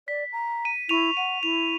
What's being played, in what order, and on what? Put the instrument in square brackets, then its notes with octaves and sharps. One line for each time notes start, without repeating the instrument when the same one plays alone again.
[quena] D5 [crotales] B6
[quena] A#5
[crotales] D#7
[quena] E4 [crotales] C#6 D#7 F7
[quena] F#5 [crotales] D#7
[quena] E4 [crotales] F7